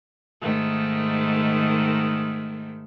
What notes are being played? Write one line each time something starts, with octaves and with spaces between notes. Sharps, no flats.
G#2 D#3 A3